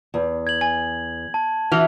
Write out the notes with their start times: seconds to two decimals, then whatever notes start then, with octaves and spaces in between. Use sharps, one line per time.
0.14 E2
0.47 G#6 F#7
0.61 G#5
1.34 A5
1.72 E3 F#4 F6 F7 G7